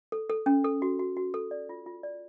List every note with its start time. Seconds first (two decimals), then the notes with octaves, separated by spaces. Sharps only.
0.12 A4
0.30 A4
0.46 C#4
0.64 A4
0.82 F#4
0.99 F#4
1.17 F#4
1.34 A4
1.51 D5
1.69 F4
1.86 F4
2.03 D5